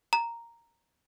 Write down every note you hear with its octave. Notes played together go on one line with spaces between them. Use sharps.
A#5